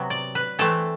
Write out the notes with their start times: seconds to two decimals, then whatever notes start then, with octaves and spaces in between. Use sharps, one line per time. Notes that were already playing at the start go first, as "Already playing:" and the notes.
Already playing: C3 F#3 B3
0.10 D5
0.35 B4
0.59 E3 A3 C4 A4